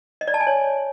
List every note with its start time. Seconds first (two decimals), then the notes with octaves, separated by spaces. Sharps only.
0.21 D#5
0.28 D5
0.34 A5
0.40 G#5
0.47 C#5